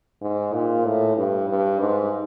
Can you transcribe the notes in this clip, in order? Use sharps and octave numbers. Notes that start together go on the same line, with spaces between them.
G#2
A#2
A2
G2
G2
G#2